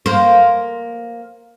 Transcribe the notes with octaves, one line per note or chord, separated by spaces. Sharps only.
A#3 C5